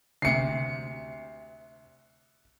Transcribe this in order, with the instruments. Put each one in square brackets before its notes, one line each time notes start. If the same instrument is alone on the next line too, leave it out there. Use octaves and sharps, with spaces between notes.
[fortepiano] D2 C3 [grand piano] C7 C#7